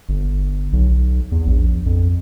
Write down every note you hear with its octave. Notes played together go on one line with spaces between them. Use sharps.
G1
B1
E2
A#1
F2